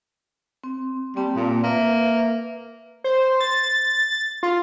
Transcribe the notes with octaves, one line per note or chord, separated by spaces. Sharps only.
C4
G3 A#3 C4 A5
A#2
A#3 B4 E5
C5
A6
F4